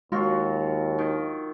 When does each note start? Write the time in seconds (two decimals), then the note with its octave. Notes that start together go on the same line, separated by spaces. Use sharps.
0.12 D#2 F#3 G#3 F4 F#4 A#6
0.98 D#3